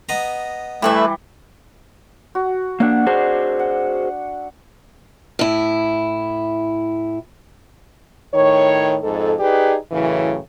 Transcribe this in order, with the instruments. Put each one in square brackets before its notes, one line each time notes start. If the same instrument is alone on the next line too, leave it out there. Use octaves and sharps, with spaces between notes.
[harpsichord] B3 D#5 A#5
[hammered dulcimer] E3 G3 [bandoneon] A3 [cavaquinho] E4 B4 E5
[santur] F#4
[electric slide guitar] A#3 D4 [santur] D5 E5 F#5
[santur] D4 [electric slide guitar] F#4 G#4 C5
[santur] F#5
[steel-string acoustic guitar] A2 E4
[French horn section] A2 D#3 C#5
F2 G#2 A4
D#4 G4 G#4 B4 D5
F#2 A2 C#3 E3